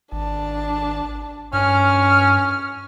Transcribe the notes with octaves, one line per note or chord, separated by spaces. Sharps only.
G#1 D4 A5
G2 C#4 F6